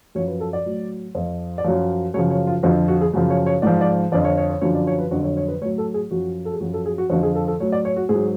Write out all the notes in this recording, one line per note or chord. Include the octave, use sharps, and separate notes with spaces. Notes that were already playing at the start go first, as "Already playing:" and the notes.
F#2 F3 C#5
B4
A4
D5
A2 F#3
F2 F3
D5
F#2 F3 C#5
F#2 C#3 F3 C#5
C#5
F4
F2 D3 F3 F#4
F#4
G#4
F#2 C#3 F3
C#5
C#5
G#2 F3 D5
D5
F2 D3 F3 D5
C#5
C#5
C#5
F#2 D3 F3 C#5
D5
C#5
B4
F2 D3 F#3 F#4
C#5
C#5
B4
A2 F#3 C#5
A4
G#4
F#2 F3 F#4
A4
G#4
F#2 F3 F#4
A4
G#4
F#4
F2 D3 F3 F#4
G#4
A4
A4
A2 F#3 C#5
D5
C#5
F#4
G#2 G#4
F#3